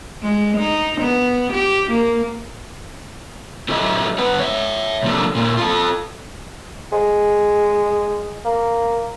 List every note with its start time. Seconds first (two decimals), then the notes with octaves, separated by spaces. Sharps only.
0.23 G#3
0.58 D#4
1.01 B3
1.53 G4
1.91 A#3
3.69 F#3 E4 G4 A4 D#5 E5
4.18 G2 B3 B4 F#5
4.39 C#5 E5
5.03 C3 F3 A#3 D4 G4 A4
5.35 A#2 A#3 E4
5.57 F4 A4
6.92 G#3
8.45 A#3